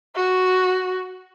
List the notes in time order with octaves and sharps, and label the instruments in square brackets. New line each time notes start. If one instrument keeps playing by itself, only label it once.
[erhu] F#4